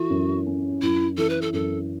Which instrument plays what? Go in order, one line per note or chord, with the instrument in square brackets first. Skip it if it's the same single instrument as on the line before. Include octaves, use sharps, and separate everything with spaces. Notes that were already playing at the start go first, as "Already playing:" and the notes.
Already playing: [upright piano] E3 A4 [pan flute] F#4
[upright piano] F#2
C#4
[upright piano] F#2 [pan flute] E4
[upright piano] E3 [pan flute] A4
[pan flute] B4
A4
[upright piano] F#2 [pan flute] A4